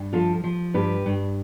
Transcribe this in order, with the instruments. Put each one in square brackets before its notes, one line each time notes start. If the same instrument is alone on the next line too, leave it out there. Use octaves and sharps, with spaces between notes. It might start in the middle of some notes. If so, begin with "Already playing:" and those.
Already playing: [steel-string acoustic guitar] G2
F3 F4 A4
F3
G2 G4 B4
G2